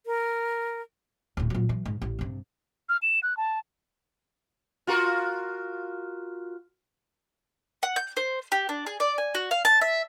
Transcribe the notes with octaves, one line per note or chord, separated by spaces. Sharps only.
A#4
D1 A2
A#2 F#3
E3 F#3
G#2
A1
G2 C3
F6
E7
F#6
A5
F4 F#4 A#4
F#5
G6
C5
G4
D4
G#4
D5
G#5
F#4
F5
A5
E5